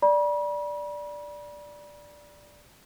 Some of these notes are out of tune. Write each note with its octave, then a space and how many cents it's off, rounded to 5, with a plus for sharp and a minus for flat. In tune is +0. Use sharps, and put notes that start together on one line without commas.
D5 +0 B5 -40